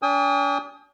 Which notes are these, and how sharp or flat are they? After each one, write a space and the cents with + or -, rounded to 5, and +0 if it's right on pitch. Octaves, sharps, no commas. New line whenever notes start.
D4 -45 G5 +45 D#6 +20